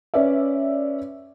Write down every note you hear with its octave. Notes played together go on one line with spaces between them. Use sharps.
C#4 B4 D5 E5